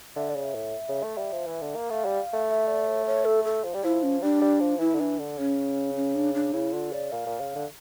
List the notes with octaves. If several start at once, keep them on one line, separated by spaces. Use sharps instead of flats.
D3 E5
D5
C#3
E5
A2
C#3
A3
G3
F3
E3
D3
A#3
A3 F5
G3
A3
E5
D5
C#5
C#5
A4
A4
F3
G3
F3 E4
C#4
G3 D4
G3
F3
E3 E4
D3
E3 D4
D3
C#3 C#4
C#4
D4
D4
C#3 E4
D3 F4
C#3 D5
A#2 F5
A#2
C#3
D3